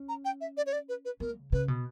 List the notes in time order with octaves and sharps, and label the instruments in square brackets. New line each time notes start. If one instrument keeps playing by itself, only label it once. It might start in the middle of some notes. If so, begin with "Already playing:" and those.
Already playing: [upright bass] C#4
[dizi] A#5
G5
E5
D5
C#5
D5
B4
B4
[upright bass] B3 [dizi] A#4
[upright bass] C#3
[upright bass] C#3 [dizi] B4
[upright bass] B2